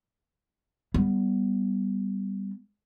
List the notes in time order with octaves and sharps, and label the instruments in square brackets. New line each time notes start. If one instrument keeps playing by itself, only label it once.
[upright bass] G3 B3